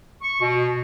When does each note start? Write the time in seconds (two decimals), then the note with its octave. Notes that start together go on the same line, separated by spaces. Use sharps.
0.22 C#6
0.41 B2